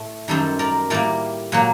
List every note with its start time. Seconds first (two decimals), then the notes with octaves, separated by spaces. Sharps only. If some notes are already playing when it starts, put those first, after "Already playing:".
Already playing: A2 A3
0.28 F#2 D#3 G3 A4 C5
0.59 A#4 D5
0.90 A2 G3 A#3 A#4 D5
1.52 A#2 F#3 A#3